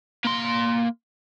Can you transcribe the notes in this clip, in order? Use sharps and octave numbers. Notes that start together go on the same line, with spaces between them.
A#3 C6